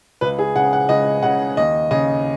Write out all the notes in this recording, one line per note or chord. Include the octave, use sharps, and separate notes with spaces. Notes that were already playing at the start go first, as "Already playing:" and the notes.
C#2 B4
G#4
C#3 F#5
F#5
C#2 D#5
C#3 F#5
D#2 D#5
C#3 D#5